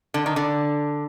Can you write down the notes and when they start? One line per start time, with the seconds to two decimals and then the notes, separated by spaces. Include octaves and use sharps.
0.14 D3
0.26 D#3
0.36 D3